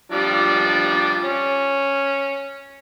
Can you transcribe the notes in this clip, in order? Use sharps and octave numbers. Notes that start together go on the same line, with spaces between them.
F3 G3 D4
C#4